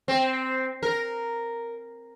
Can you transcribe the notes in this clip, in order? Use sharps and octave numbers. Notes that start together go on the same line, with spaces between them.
C4
A#4